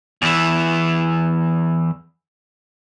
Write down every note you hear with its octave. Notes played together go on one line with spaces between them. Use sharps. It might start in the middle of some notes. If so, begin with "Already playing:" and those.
E2 E3